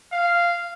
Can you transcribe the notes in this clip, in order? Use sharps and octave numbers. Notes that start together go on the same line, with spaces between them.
F5